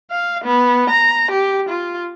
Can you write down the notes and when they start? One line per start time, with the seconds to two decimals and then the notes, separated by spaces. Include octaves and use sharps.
0.11 F5
0.44 B3
0.90 A#5
1.31 G4
1.69 F4